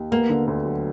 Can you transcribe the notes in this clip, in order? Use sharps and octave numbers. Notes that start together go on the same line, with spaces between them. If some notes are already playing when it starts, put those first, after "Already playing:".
Already playing: D#2
A#3 B3
D3
D2
F#3